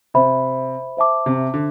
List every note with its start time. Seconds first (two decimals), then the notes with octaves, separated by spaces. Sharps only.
0.14 C3 C5 E5 B5
0.97 C5 E5 A5 D6
1.26 C3
1.54 D3